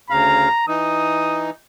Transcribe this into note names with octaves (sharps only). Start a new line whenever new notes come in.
D2 C#3 F5 A#5
E3 D#4 D#6